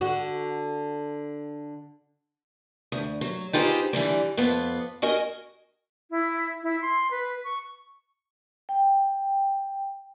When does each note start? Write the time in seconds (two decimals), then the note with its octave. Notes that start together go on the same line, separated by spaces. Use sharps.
0.01 D3 F#4
2.92 D2
3.21 F#3
3.53 D#4 F4 G4 G#4 B4 C5
3.93 D3 E3 G3 A#3
4.37 F2 B3 F4
5.02 F#4 A#4 D#5 G#5
6.11 E4
6.63 E4
6.82 C6
7.11 B4
7.44 C#6
8.69 G5